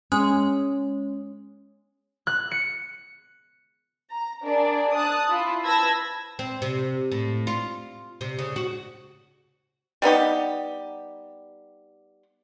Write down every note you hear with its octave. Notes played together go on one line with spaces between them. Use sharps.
G#3 C#4
F#6
C#7
A#5
D4 G#4 A#4 D5
A5 D#6 F#6
E4 F4
B4 A5 B5 E6 G#6 A#6
C4
C3
A2
F4
C3
C#3
F#4
G3 B3 D#4 G4